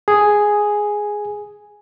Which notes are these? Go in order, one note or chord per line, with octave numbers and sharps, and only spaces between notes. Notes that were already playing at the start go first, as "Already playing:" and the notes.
G#4 G#5